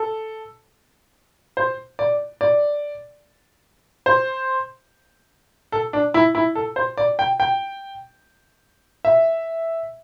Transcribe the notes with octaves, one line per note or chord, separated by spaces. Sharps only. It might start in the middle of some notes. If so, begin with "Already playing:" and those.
Already playing: A4
C5
D5
D5
C5
A4
D4
E4
E4
A4
C5
D5
G5
G5
E5